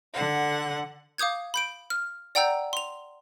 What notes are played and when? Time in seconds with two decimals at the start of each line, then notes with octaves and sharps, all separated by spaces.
0.13 D3 F#5
1.18 F5 D6 D#6 G6 G#6
1.54 B5 G6 D7
1.90 F6
2.35 D5 F#5 G5 A#5 E6 G6
2.73 C6 F7